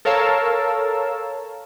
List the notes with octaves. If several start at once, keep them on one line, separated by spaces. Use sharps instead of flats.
A4 A#4 C#5 F5 A5 E6